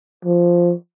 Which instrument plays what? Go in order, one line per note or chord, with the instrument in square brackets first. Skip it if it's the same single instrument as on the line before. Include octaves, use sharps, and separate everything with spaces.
[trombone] F3